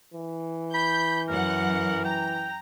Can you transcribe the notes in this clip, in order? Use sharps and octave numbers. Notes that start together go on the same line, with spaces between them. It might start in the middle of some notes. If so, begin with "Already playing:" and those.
E3
B5 G6
F#2 A#4 F#5
G5 A#5